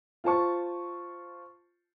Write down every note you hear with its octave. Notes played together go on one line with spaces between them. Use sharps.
F4 C5 A5 C#6